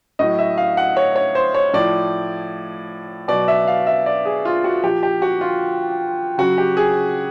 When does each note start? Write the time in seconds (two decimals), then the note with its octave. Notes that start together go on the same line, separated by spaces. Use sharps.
0.19 A2 F#3 D#5
0.38 E5
0.58 F5
0.77 F#5
0.97 C#5
1.16 C#5
1.35 C5
1.54 C#5
1.73 A2 F3 D5
3.28 B2 F#3 D5
3.48 E5
3.68 F5
3.87 E5
4.06 D5
4.25 G#4
4.45 F4
4.64 F#4
4.83 A#2 F3 G4
5.03 G4
5.22 F#4
5.41 F4
6.38 C#3 F#3 F#4
6.58 G4
6.77 G#4